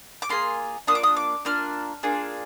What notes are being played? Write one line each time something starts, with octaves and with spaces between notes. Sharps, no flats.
D6
A#3 D4 F4 G#4 C6
A#3 D4 F4 D#6
D6
D#6
D6
A#3 D4 F4 F6
A#3 D4 F4 G#4